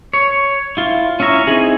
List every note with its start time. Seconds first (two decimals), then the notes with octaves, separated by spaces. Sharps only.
0.13 C#5
0.77 E4 F4
1.20 C#4 E4 E5 A#5 C#6
1.47 C4 D#4 E4 G#4